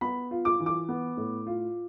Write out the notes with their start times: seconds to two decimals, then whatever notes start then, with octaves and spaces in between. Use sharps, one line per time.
0.01 B3 B5
0.31 F4
0.45 D6
0.60 E3
0.66 D6
0.89 B3
1.17 A2
1.47 F4